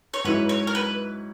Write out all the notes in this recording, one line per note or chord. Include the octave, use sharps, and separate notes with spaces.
C#5
G#2 F#3 C#4 E4 B4
C#5
A#4
B4